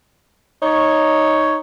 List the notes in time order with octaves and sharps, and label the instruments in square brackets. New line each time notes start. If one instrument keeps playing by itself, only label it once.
[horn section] D#4 C#5